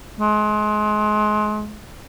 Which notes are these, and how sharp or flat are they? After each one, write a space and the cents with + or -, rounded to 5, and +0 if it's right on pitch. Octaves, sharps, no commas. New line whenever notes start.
G#3 +30